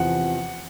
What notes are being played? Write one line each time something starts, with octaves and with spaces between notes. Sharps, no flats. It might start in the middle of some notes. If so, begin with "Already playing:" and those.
Already playing: E2 C3 F3 F#5